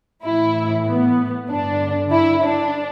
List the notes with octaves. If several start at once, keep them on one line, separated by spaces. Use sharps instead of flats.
A2 E3 E4
B3
G2 D3 D4
E4
D4